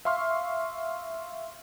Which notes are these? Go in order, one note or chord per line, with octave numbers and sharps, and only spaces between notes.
E5 F5 C6 C#6 F6